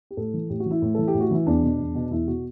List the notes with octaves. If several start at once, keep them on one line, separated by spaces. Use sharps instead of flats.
G4
A2 A4
E3
A2 G4
F#4
E3
E4
A2
E3 A4
G4
A2
F#4
E3 E4
E2 D4
B2
E2
B2
E2 E4
B2 F#4